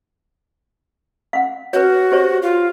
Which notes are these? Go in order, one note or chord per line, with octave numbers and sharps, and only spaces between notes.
F5 F#5
F#4 B4 C#5
G4 C5 C#5
F4